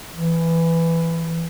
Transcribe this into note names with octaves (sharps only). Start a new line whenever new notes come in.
E3